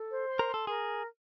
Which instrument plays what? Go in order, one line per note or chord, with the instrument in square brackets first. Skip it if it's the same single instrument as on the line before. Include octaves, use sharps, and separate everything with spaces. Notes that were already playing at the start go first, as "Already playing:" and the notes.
Already playing: [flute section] A4
C5
C6
[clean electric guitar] A#4
[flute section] C6
[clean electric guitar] A4
[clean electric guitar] G#4 [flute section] A#4